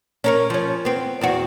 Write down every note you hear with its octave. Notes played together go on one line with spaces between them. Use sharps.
C#4 A#4 C#5
F3 C#4
B3 C4
E2 C4 F#4